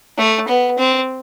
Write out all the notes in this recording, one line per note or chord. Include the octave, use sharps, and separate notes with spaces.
A3
B3
C4